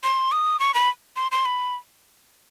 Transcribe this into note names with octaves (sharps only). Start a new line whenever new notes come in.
C6
D#6
C#6
B5
C6
C6
B5